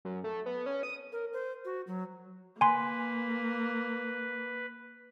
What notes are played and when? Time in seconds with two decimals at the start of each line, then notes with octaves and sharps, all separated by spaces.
0.05 F#2
0.24 A3
0.46 B3
0.66 C#4
0.83 D#6
1.12 A#4
1.33 C5
1.65 F#4
1.87 F#3
2.61 A#3 B4 G#5 C6